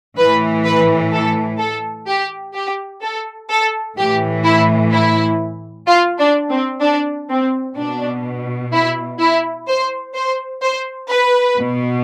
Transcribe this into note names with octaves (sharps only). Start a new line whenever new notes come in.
A2 E3 B4
B4
A4
A4
G4
G4
A4
A4
A2 E3 G4
E4
E4
F4
D4
C4
D4
C4
B2 D4
E4
E4
C5
C5
C5
B4
B2